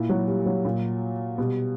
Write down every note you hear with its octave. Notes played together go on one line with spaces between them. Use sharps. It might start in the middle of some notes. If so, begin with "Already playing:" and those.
Already playing: A#2 E4
F#3
G3
F#3
A#2
B2 G3